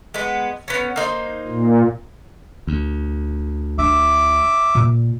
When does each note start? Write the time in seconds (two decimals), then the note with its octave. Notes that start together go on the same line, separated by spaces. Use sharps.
0.14 G#3 B3
0.68 B3 C#4
0.96 A#3 D#4 C5
1.48 A#2
2.67 D2
3.78 D4 E5 D6
4.75 A#2